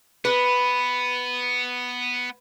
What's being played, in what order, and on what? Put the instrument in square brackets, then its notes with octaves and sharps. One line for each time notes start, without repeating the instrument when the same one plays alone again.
[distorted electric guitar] B3 [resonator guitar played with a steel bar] B4